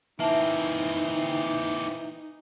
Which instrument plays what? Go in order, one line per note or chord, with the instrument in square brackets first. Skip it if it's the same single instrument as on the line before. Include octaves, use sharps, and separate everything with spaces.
[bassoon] E3 [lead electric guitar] A#3 C4 [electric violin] D#4 [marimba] E5 A5